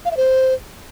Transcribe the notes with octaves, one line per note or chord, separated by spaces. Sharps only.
F5
E5
C5